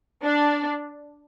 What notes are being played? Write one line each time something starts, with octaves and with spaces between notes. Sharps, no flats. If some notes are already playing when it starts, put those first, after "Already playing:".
D4